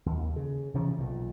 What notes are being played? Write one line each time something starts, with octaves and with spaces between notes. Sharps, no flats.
D#2
C#3
C3 E3 F3 C#4
B1 A#2